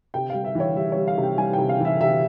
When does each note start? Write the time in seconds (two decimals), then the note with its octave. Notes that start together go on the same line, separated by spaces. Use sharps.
0.14 C3 G5
0.30 G3 F5
0.44 E5
0.55 E3 C#5
0.76 G3 E5
0.92 G3 C#5
1.08 F5
1.18 C3
1.23 G5
1.38 G3 G#5
1.53 C3 G5
1.69 F5
1.80 E3 E5
2.01 C3 E5